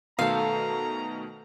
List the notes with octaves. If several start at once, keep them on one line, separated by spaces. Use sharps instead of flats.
B2 D#3 A3 A4 C5 F5 A#5